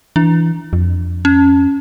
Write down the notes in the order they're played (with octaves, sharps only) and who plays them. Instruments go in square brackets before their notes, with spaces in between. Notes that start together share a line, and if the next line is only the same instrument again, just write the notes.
[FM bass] E3 [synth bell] D4
[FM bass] F2
[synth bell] C#4